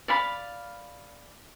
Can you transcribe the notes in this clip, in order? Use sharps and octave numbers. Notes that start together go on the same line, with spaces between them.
D5 F5 B5